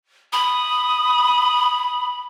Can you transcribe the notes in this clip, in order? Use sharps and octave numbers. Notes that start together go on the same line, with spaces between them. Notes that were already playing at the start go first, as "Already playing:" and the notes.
B5 D#6